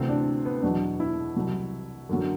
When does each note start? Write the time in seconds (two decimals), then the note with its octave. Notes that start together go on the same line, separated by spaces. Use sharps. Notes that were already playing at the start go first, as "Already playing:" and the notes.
Already playing: D2 C3 E3 C4
0.08 D4
0.45 B3
0.62 E2 B2 F#3 D4
1.00 E4
1.36 C2 C3 F#3
2.09 F#2 D3 F#3